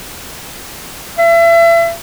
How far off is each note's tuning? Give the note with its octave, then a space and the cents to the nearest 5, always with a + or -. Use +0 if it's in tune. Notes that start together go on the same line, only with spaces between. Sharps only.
E5 +35